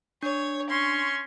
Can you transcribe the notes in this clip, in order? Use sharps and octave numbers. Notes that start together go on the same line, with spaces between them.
D4 C#5
C#4 C6 C#6